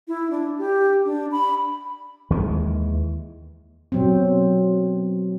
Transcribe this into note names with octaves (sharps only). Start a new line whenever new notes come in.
E4
D4
G4
D4
B5
D#2 D#3 E3 G#3
B2 F#3 C4